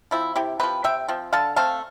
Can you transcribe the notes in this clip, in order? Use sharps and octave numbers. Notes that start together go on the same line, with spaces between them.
F3 C4 E4
C3 E4 G4
F3 C4 G4 B4
C3 E5 G5
F3 C4
D3 F5 A5
A3 C4 F5 A5